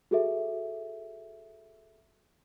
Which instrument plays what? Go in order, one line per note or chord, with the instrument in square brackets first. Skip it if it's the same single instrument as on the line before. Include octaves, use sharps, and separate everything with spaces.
[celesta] F#4 G#4 A4 E5